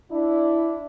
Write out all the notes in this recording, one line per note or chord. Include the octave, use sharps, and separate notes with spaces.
D4 E4